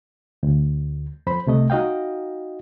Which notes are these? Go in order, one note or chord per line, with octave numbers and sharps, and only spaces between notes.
D2
F2 C5 B5
C2 C3 A3 D#5
D#4 F#4 D#5 F5 G5